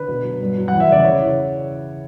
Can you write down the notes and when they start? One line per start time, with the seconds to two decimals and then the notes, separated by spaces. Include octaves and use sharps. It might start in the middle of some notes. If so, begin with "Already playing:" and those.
Already playing: D3 B4
0.08 B2
0.24 F#3
0.41 G2
0.57 F#3
0.68 E2 F#5
0.80 E5
0.89 C#3 D5
1.04 C#3 C#5
1.20 E3